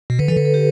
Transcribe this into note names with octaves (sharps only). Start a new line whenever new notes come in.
B2
D3 B4
E3 A4
D3 B4
A4
G4